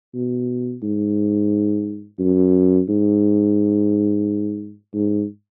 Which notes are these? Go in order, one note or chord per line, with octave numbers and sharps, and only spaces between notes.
B2
G#2
F#2
G#2
G#2